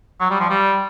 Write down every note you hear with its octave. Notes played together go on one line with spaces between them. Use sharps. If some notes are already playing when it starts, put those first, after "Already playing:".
F#3
G3
F3
G3